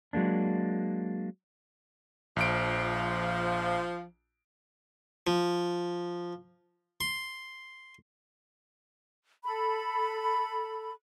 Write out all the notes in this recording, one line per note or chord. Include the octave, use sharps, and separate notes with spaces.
F#3 G#3 A#3 D4
A#1 F3 D7
F3
C6
A4 B5